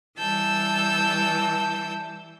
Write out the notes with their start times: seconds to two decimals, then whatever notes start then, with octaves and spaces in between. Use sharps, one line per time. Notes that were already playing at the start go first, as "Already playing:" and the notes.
0.18 E3 G3 A5 E6 G6